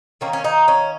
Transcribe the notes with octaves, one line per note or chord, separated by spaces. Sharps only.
D#3 A#3 C#4
C#4
D#4
C#4